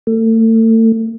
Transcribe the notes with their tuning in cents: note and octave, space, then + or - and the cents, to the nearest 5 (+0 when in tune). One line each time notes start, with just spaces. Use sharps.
A3 +35